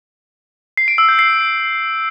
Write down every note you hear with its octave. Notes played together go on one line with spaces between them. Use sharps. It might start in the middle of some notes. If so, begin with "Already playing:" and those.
C7
D7
E6
G6
C7